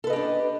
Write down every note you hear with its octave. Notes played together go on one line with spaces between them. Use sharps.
D4 G4 A4 B4 D#5